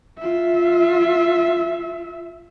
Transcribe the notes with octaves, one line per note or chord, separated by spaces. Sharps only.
F4 E5